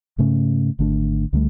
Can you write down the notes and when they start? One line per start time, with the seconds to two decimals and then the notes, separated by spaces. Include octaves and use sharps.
0.18 G#2 C#3 A3 C#4
0.79 G#1 D3 A3 D4
1.33 C#2 D3 G3 A3